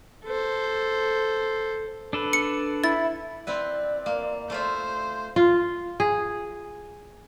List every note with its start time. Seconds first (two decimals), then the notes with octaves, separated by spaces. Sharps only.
0.25 A4 C5
2.13 D4 A4 B4
2.33 C#7
2.84 E4 A6
3.47 C4 E4 B4 D5
4.06 A#3
4.50 A3 F4 C5 E5
5.36 F4
6.00 G#4